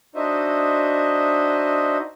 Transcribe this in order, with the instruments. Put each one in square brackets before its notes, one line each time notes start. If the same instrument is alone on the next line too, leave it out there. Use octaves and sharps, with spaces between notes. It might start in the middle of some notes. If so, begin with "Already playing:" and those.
[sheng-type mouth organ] D4 D#4 F#4 C5 D#5 E5